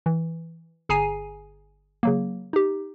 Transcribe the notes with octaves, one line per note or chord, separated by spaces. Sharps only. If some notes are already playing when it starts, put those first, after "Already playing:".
E3
G1 G#4 G#5 A#5 C7 D#7
C#3 F#3 A#3
D#4 G4